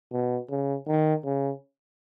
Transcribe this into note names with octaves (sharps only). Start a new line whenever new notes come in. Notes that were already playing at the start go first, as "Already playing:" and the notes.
B2
C#3
D#3
C#3